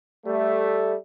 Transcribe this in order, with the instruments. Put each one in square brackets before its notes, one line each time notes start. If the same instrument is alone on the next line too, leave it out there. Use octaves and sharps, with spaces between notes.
[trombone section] G3 A3